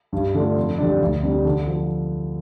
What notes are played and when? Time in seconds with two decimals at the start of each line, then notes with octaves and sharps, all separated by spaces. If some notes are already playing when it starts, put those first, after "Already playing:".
0.13 G2
0.35 D3 A3 D4 F4
0.56 F2
0.78 D3 G3 D4
1.01 D2
1.23 C3 G3 D4
1.45 D3
1.67 F3